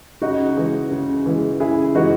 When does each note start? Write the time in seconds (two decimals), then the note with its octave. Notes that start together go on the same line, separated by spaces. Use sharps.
0.22 C#3 D#4 F#4
0.57 E3 G#3
0.91 C#3
1.26 E3 G#3
1.60 C#3 E4 G#4
1.95 E3 G#3 D#4 F#4